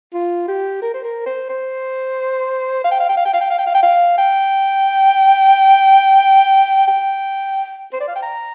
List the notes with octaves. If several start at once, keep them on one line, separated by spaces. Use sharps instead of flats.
F4
G4
A#4
C5
A#4
C5
C5
F5
G5
F5
G5
F5
G5
F5
G5
F5
G5
F5
G5
F5
G5
G5
C5
D5
F5
G5
A#5